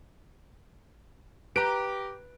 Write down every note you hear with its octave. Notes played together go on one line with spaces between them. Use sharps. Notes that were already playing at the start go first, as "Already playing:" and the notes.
G4 B4 A#5 D7